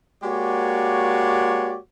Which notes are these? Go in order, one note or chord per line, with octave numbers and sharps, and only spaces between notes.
G#3 A#3 F#4 G4 C#5 D5